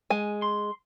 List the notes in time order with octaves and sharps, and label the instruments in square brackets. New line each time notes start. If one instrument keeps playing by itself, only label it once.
[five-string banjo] G#3 G#5
[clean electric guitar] C6